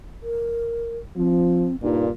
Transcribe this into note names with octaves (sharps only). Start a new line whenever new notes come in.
A#4
F3 C4
G2 A#2 D#4